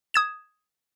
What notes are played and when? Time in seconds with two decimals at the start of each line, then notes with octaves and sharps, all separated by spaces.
0.14 D#6 G#6 E7